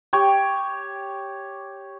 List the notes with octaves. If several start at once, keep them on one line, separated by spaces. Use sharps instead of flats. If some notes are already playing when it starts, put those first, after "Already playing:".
G4 C#5